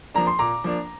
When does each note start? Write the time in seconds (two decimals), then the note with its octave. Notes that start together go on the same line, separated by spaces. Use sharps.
0.14 F3 A#3 D4 A#5
0.27 C6
0.39 A#2 A#5 D6
0.64 F3 A#3 D4